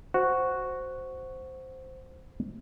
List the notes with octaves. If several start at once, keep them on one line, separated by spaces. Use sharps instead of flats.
F#4 C5